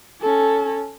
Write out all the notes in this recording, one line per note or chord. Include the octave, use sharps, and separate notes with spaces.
C#4 A4